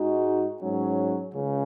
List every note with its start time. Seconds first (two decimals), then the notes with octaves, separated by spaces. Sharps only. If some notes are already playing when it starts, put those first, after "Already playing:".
Already playing: G#2 G#3 D#4 F#4
0.60 G#2 F#3 C#4
1.34 C#2 C#3